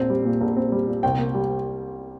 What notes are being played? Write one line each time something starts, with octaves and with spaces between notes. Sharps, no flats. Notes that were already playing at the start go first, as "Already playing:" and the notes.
Already playing: A#1 C4
G3
A#2
A#1
C4
G3
A#2
C2 G5
A#3
G3